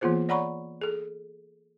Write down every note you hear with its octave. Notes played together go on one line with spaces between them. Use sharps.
E3 A#3 B3 F4 G#4 C5
C#5 D5 F#5 A#5 B5 C#6
G#4 A4